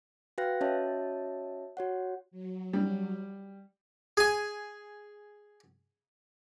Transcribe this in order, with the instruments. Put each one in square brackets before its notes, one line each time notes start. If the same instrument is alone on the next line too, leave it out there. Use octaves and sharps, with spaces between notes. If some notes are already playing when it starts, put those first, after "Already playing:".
[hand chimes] F#4 B4 F5 G5 F#6 A#6
C#4 F#4 C#5 D#5 E5 A5
F#4 C#5 F#5
[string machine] F#3
[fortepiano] G3
[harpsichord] G#4 G#5